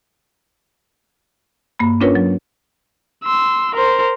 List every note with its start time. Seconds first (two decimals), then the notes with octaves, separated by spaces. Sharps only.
1.79 G2 A#3 B5
2.01 C#4 D4 F4 A#4 B4 C#5
2.15 F#3
3.24 C6 E6
3.75 A#4 C5